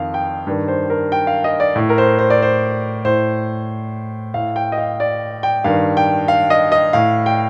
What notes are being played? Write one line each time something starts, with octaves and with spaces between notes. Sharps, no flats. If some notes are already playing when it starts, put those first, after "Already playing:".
Already playing: F2 D#3 F5
G5
G2 D#3
C5
A#4
G5
F5
D#5
D5
A2
A#4
C5
C5
D5
C5
A2 C5
A2 F5
G5
D#5
F5
D5
G5
G2 D#3 F5
G5
F5
D#5
D#5
A2 F5
G5